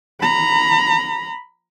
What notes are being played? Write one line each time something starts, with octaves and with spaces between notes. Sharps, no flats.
A#5 B5